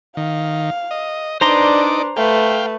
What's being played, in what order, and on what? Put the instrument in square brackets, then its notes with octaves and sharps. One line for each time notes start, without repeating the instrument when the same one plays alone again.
[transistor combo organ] D#3 [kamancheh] F5
[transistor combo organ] D#5
[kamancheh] D4 B4 [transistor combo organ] D#4 D5 [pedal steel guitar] C5 A#5 C6
[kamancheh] A3 B4 [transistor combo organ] F5 G5